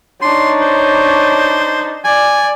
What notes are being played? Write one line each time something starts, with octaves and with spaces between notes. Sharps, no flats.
D4 D#4 C#5 C6
C5
D5 G#5